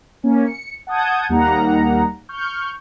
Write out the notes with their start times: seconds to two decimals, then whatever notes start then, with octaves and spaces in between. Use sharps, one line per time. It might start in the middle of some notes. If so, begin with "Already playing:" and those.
0.23 A#3 C#4
0.45 C#7
0.87 F#5 A5 D#6 G6 G#6
1.29 D#2 G3 A#3 D#4 F#5 A#5
2.29 C#6 F6 G6